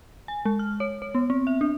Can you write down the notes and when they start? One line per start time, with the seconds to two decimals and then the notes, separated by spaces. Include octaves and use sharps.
0.28 G#5
0.45 G#3
0.59 F6
0.80 C#5
1.02 C#5
1.15 B3
1.30 C4
1.47 E5
1.61 D4